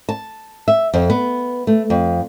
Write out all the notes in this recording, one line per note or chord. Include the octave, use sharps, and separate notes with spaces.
A5
E5
F2
B3
A3
F2